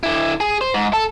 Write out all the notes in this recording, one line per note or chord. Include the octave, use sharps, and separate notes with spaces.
D3 E4
G#4
C5
G#2
A4